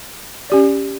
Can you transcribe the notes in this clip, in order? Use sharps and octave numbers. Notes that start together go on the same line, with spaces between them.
C#4 G4 D5